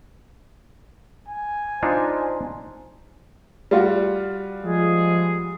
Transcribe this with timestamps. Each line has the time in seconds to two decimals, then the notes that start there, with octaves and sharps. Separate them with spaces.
1.28 G#5
1.83 D4 D#4 F4 C5
3.71 G3 F4 F#4
4.64 F3 G#3 G#4